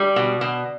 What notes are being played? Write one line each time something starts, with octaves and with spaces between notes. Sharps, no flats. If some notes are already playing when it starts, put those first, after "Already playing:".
Already playing: G3
B2
B2